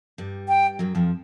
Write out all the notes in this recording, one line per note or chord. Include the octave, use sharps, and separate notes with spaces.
G2 G3
G5
F#2 F#3
F2 F3